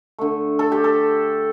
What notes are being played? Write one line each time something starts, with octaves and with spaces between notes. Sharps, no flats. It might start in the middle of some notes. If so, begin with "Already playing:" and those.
D3 A3
A4
G4
A4